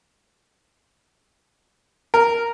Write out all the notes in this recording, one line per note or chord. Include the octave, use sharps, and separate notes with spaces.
A#4